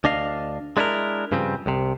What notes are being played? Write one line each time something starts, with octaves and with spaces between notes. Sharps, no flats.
D2 D4 D#5 F5
G#3 D4 E4 G#4 A#4
G2 C#3 F3 C4
C2 C3